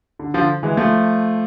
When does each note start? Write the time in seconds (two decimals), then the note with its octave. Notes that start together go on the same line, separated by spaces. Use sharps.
0.19 D3
0.34 D3 F3
0.63 E3 G#3
0.77 F3 A3